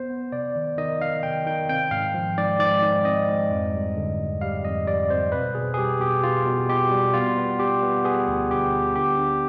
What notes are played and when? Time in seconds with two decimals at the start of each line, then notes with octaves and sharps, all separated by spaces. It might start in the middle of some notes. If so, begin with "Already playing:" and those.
Already playing: B3 C5
0.10 B3
0.32 C3 D5
0.56 D#3
0.78 D#3 D#5
1.00 D#3 F5
1.23 C3 G5
1.46 D#3 G5
1.69 C4 G5
1.91 G#2 F5
2.14 F3
2.37 G#2 D5
2.60 G#2 D5
2.83 G#2
3.05 C4 D#5
3.28 G#2
3.51 F2
3.74 G3
3.96 D3
4.19 F2
4.41 G3 F5
4.64 F2 D#5
4.87 G3 D5
5.10 C4 C5
5.32 B2 B4
5.55 B2 G#4
5.74 G#4
5.78 G3 G4
6.00 B2 G4
6.23 B2 F4
6.46 B2
6.69 B2 G4
6.91 G3
7.14 B3 F4
7.37 B3
7.59 G3 G4
7.83 B3
8.04 B3 G#4
8.28 D2
8.50 D3 G4
8.73 B3
8.95 D3 G4
9.18 D4